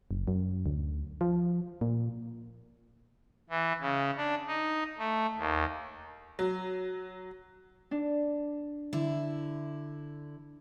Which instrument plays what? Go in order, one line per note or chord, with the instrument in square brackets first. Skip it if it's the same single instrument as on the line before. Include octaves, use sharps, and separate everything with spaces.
[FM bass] F#1
F#2
D2
F3
A#2
[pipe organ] E3
C#3
D4
D#4
A3
D#2
[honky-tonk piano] F#3
[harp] D4
[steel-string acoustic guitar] D3 E4